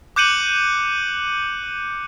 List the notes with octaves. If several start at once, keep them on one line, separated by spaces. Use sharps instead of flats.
D6 F#6 G6 C#7 D#7 F#7